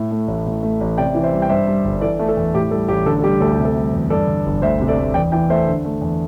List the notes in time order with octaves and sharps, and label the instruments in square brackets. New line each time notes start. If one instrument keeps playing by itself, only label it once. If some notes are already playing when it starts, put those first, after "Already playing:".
Already playing: [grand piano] A2
A3
A1
A2
A3
A1
C3 D5 G5
E3
C5 E5
G3
G5
G2 C5 E5
G3
G1
E3 A4 D5
A3
A4
E2
A2 G4
G3 A4
A1 G4
D3 A4
A4
G3 G4
D2 A4
G4
C3
A4
G3
E2
G2 A4 D5
D3
G1
D2 C5 E5
C3
A4 D5
A3
E2 D5 G5
E3 D5 G5
A3 C5 E5
D3
A3
E2